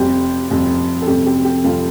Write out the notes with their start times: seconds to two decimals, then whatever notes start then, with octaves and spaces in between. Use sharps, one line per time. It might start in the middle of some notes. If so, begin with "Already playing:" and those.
Already playing: F1 F2 C3 G3 G4
0.50 F1 F2 C3 G3
1.02 A4
1.07 F1 F2 C3 G3 G4
1.26 G4
1.45 G4
1.64 F1 F2 C3 G3 F4 A4